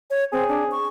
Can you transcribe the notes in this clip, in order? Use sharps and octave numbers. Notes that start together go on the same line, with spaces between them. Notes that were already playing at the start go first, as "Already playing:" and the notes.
C#5
C4 G#4
D4
C#6